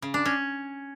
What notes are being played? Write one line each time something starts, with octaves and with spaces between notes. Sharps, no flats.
C#3
D4
C#4